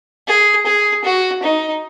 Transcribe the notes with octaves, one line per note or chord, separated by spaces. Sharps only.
G#4
G#4
F#4
D#4